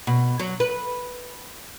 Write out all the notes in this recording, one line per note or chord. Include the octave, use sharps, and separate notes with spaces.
B2
F#3
B4